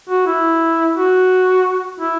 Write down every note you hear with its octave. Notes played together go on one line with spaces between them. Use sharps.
F#4
E4
F#4
E4